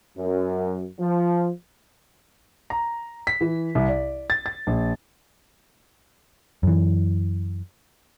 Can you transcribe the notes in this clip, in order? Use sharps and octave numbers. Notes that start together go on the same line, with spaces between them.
F#2
F3
A#5
B6
E3
C2
D5
A6
A6
A#1
F#2 E3